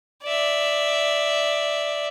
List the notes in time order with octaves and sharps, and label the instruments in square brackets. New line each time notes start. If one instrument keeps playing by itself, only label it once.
[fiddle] D5 E5